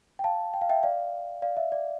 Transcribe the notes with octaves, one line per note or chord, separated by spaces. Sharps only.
G5
F5 A5
G5
F5
E5 G5
D5 F5
D5 F5
E5
D5